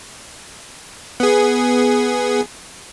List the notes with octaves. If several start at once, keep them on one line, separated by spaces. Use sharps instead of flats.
B3 G#4